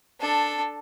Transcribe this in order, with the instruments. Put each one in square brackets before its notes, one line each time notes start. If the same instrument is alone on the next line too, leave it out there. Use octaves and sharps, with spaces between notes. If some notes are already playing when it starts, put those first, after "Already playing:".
[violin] D4 A4